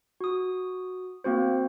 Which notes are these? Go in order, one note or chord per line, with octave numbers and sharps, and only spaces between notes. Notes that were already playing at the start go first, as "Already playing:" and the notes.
F#4 D#6
A#3 C4 F#4 C5